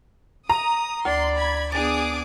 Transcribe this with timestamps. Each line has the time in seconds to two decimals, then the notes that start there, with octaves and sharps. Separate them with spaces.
0.49 A#5 D#6
1.05 D2 D5 C6
1.36 B5 G#6
1.72 B3 D4 G#4 D6 D#6 A6